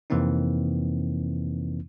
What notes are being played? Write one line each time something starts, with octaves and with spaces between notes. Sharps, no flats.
F2 C3 E3 A#3 C4 D#4